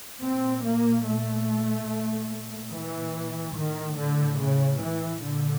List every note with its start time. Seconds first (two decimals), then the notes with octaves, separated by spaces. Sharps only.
0.22 A#2 C4
0.63 A#3
1.05 A3
1.89 A#2
2.73 E3
3.55 A2 D#3
3.97 D3
4.39 C#3
4.80 E3
5.22 A#2 D3